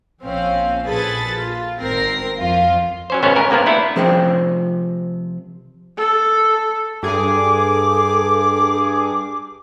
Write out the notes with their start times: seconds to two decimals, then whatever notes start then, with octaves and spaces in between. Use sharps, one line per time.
0.23 A#1 C4 C#4 F5
0.85 A#1 G#4 A4 B4 B5 A6
1.37 F4
1.81 G#1 C4 A#4 A#6 C7
2.38 F2 F4
3.10 F#3 C#4 C5
3.23 G#1 C#2 B3 C#4 C5 C#5
3.36 C#2 A#4 G#5
3.50 G2 C3 A#3 B3 A#4
3.66 A3 B3 D4 E4 A4
3.96 C3 F3 G#4 C5 G5
5.97 A4
7.03 G2 G#4 A4 D6